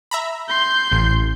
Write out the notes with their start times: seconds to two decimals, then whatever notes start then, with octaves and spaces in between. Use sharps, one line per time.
0.11 E5 A#5 B5
0.48 C6 G6
0.92 A1